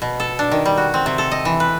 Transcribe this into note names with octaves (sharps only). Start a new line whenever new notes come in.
B2
A4
D4
D#3
G3
F#4
C4
C3
A4
D#5
E3
B4